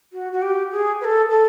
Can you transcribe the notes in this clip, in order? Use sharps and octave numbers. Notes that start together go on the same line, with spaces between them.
F#4
F#4
G4
G#4
B4
A4
A4